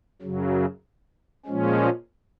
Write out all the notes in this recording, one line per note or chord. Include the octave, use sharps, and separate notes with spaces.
F#2 C#3 F#3
A#2 F3 G#3 C#4